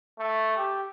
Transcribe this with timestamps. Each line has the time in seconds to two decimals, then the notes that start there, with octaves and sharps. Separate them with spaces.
0.19 A3
0.57 G4